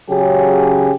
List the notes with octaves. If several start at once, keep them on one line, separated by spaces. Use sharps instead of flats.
C#3 F#3 C#4 G4 G#4